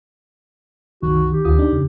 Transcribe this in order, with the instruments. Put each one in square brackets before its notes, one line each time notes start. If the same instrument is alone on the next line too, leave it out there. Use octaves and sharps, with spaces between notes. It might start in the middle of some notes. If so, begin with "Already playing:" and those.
[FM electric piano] C2 F#2 [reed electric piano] D#3 [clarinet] F#4
[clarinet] G4
[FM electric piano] D2 F4 D#6
D4 D#4
F2 C#3